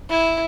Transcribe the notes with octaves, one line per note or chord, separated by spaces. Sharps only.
E4